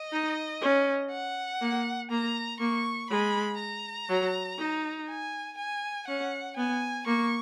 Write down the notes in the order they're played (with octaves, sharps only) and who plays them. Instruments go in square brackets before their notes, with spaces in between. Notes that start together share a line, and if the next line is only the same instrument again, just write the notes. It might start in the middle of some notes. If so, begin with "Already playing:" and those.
Already playing: [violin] D#5
[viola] D#4
C#4
[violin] F#5
[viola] A#3
[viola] A#3 [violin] A#5
[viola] A#3 [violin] C#6
[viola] G#3 [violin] B5
[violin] A#5
[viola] F#3
D#4
[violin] G#5
G#5
[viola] C#4 [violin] F#5
[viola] B3 [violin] G#5
[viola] A#3 [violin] C#6